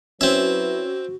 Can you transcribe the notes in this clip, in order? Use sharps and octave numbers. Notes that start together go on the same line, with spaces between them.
F#3 C4 C#4 E4 F#4 B4 E5